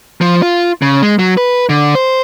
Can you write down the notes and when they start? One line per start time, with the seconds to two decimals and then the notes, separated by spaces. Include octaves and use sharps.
0.21 F3
0.42 F4
0.82 C#3
1.02 G#3
1.19 F#3
1.37 B4
1.69 D3
1.95 C5